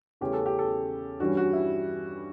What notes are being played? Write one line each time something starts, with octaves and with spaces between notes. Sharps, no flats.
E2 C#3 E3 A3 C#4 G4
A4
G4
A4
G2 E3 G3 C#4 F#4
F#4
E4